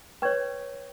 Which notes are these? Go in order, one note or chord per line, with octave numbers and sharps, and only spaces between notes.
B4 C#5 G5 C#6 G#6